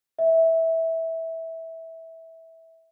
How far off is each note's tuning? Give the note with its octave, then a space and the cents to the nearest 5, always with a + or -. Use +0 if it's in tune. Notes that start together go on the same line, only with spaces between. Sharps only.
E5 -15